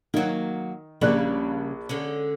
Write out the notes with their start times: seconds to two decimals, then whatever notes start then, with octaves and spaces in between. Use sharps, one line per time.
0.14 D#3 F#3 A#3
1.01 A#1 C#3 G3 A#3 D5 F#6
1.89 D3 G#3 C#4